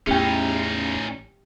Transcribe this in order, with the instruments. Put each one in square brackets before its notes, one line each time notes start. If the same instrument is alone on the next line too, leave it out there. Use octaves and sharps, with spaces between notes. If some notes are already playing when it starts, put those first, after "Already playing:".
[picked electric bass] A1 [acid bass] E2 [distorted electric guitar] C#4 D#4 [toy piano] G4 G5